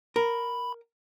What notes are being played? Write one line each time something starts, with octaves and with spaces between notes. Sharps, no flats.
A#4 B5